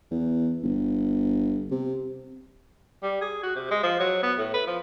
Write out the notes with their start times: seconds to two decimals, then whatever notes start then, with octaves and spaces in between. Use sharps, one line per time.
0.11 E2
0.63 G1
1.71 C3
3.03 G3
3.21 G#4
3.43 F#4
3.56 C3
3.71 G#3
3.83 F3
4.00 F#3
4.23 B3
4.38 A2
4.54 B4
4.67 F3